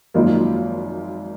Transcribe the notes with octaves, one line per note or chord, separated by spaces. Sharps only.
G#1 F#2 F3 A#3 D#4